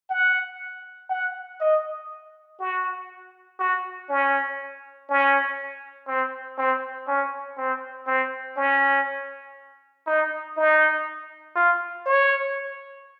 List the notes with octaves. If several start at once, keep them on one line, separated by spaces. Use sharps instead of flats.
F#5
F#5
D#5
F#4
F#4
C#4
C#4
C4
C4
C#4
C4
C4
C#4
D#4
D#4
F4
C#5